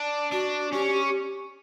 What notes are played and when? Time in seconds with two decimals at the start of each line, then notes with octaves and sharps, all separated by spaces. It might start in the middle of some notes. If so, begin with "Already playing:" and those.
Already playing: D4
0.32 D4 F#4
0.72 C#4 G4